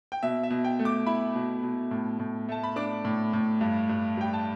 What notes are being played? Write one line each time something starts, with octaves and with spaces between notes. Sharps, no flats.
G5
B2 E5
E5
B2
G5
A3
D6
E4 B5
B2
B2
A2
A2
A3 A5
B5
D4 D6
A2
A2
G2
G2
G3 G5
A5